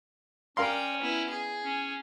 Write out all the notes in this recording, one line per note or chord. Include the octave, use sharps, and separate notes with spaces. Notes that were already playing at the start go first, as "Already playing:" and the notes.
C#4 A#4 D5 F5 G5 C6
B3 E4
G#4
C#4